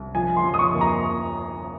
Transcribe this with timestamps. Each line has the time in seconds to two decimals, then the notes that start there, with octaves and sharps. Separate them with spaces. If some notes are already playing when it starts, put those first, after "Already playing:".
Already playing: C2
0.15 F3 G#5
0.37 C6
0.44 F3
0.54 D#6
0.59 C#6
0.73 D#2
0.81 A#5